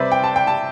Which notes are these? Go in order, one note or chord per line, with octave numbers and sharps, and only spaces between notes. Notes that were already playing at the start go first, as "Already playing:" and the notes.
Already playing: C3 G3 B4 C5 D5 E5
G5
A5
G5
A5